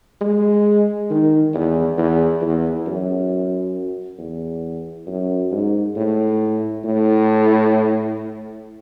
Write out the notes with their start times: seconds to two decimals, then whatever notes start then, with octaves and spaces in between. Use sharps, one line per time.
0.21 G#3
1.10 D#3
1.54 E2
1.98 E2
2.42 E2
2.86 F#2
4.18 E2
5.07 F#2
5.51 G#2
5.96 A2
6.85 A2